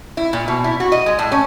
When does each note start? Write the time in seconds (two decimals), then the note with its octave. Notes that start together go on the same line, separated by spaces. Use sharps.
0.17 E4
0.33 A#2
0.48 B2
0.64 E4
0.80 F#4
0.92 D#5
1.06 G#3
1.19 A2
1.32 C#4